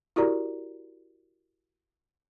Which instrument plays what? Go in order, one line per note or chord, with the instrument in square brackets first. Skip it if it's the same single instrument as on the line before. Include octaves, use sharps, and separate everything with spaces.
[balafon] E4 F#4 G4 A#4 D5 A#5